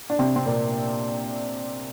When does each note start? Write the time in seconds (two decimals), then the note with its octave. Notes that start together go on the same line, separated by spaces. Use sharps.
0.10 D4
0.19 C3 C4
0.36 C4
0.46 A#2 A#3